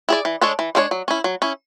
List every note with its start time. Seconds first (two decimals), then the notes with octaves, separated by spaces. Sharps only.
0.09 E4 G#4 D5
0.25 E3
0.41 G#3 D4 A4 C#5
0.59 E3
0.75 G#3 D4 A4 C#5
0.91 F#3
1.08 C#4 E4
1.24 F#3
1.42 C#4 E4